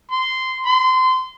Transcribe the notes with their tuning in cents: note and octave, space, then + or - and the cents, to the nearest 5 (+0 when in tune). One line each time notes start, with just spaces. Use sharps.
C6 -15
C6 -25